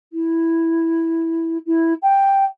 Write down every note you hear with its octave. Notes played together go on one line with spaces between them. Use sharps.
E4
E4
G5